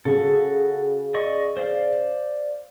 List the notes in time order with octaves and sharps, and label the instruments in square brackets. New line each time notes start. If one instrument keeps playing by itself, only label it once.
[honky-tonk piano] C#3 [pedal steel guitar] F#4 A4
[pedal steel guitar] D5 D#5 C#6
C5 D5 F5